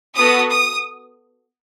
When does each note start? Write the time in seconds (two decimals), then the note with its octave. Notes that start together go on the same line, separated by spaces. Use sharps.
0.17 B3 F#4 A4 D#6
0.50 D#6